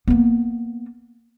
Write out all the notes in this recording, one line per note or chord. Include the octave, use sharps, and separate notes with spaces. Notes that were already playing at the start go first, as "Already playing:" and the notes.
A#3 B3